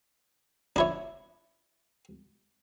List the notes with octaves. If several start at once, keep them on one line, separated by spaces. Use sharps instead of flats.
D4 E4 C#5